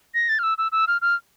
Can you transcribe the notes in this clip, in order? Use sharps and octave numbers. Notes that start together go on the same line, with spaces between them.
A#6
A6
F6
E6
E6
E6
F6
F6